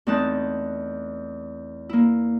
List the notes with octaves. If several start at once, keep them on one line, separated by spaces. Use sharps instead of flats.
E2 A3 C4 D#4 A5 F#6
A#3 E4